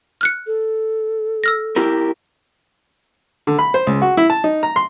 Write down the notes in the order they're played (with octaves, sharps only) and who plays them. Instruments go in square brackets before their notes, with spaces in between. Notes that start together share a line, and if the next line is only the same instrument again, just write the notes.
[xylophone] F6 F#6 C#7
[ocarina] A4
[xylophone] E6 F6 A#6
[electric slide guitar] E4 G4 A#4
[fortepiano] D3
B5
C5
C#2
F#4
E4
A5
D#4
A#5
C6